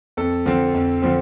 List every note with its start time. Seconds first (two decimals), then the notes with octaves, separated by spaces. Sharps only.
0.17 F2 A4
0.46 D3 F3 C4
0.75 F2
1.02 D3 F3 C4